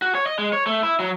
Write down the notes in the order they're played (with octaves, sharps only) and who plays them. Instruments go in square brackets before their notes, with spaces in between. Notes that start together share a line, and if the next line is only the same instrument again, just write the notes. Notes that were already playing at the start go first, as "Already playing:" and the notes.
[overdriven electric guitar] F#4
C#5
D#5
G#3
C#5
A3
E4
F#3